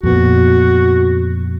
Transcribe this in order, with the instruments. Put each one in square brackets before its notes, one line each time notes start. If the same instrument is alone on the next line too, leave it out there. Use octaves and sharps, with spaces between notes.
[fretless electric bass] F2 A#2 B3 [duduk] F#4